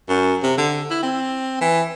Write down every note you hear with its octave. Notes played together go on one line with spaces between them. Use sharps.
F#2
C3
D3
E4
C4
E3